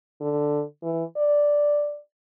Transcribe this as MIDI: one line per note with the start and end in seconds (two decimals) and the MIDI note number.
0.21 0.62 50
0.83 1.04 52
1.16 1.99 74